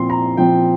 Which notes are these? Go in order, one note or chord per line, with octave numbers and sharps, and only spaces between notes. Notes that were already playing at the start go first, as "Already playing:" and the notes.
Already playing: A#2 F3 C4 C6
A#5
A#2 F3 C4 G5